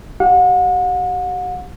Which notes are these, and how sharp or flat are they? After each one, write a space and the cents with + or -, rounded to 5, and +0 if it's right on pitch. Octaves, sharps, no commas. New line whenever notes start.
G4 -25 F#5 -40